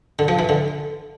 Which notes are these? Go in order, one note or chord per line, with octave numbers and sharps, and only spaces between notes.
D3
F3
E3
D3